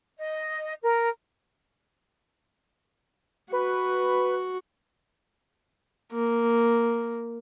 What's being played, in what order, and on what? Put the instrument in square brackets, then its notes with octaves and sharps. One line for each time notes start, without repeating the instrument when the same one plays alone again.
[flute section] D#5
A#4
[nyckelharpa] F#4 [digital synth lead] B4
[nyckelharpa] A#3